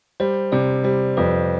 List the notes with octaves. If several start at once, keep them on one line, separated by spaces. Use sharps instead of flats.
G3 C5
C3 D5
G3 C5
F2 B4